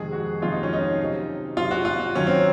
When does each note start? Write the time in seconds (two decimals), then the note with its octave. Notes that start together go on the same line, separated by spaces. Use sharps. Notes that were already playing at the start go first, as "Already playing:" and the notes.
Already playing: F2 C3 D#3 G#3 G#4
0.12 F#4
0.41 F2 C3 D#3 G#3 F4
0.52 D#4
0.63 C#4
0.73 D#4
1.00 C3 F#3
1.57 C3 F#3 F4
1.71 F#4
1.85 F4
2.15 F#2 D#3 F#3 C#4
2.27 C4